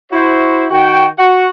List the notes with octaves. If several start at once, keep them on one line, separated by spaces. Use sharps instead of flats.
E4 F#4 C5
D#3 F#4 G5
F#4 F#5